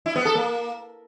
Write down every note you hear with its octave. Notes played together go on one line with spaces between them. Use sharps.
E4
B3
A4
A#3